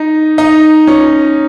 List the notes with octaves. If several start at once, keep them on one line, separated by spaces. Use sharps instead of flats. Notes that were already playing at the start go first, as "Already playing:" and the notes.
Already playing: D#4
D#4
C#4